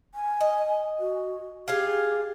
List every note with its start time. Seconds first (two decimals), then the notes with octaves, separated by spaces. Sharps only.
0.15 G#5
0.41 D#5
1.00 F#4
1.68 F4 G4 G#4 F5